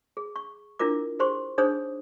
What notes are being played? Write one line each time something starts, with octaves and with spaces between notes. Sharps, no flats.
G#4
C#6
D4 E4 F4 A#4 D6
G4 G#4 C5 C6 C#6
D4 D#4 G#4 C5 C#5 D#6